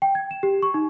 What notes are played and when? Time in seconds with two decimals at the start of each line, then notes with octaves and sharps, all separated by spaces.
0.02 G5
0.15 G#6
0.31 E7
0.43 G4
0.63 C#6
0.74 D#4